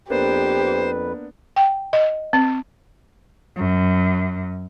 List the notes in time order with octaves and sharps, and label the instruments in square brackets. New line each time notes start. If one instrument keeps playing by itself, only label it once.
[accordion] F2 B4 [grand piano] A#3 B3 D4 [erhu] G4 [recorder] C5
[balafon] G5
D#5
C4
[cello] F#2